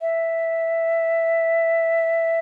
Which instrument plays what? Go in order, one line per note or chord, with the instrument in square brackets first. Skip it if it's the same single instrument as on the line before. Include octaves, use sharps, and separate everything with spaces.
[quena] E5